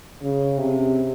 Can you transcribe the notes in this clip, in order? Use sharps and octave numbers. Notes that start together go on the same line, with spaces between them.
C#3
C3